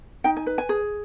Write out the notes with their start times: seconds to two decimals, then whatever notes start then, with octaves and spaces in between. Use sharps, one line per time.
0.24 D#4 G5
0.37 G#5
0.47 B4
0.58 G#5
0.69 G#4